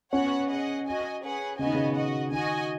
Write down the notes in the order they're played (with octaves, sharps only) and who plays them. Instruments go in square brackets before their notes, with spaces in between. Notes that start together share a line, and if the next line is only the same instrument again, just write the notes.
[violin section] B3 F#4 C#5 F#5 [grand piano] C#4
[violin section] G#4 D#5 F#5
F#4 D#5 G#5
C#4 G#4 B4 F#5
[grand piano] C#3 [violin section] B3 F#4 D#5 G#5
[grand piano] D#3
C#3
[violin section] F#4 D#5 F#5
[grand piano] D#3 [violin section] F#4 D#5 G#5